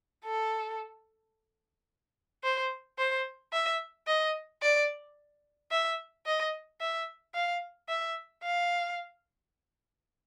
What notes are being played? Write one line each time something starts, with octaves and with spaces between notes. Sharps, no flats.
A4
C5
C5
E5
D#5
D5
E5
D#5
E5
F5
E5
F5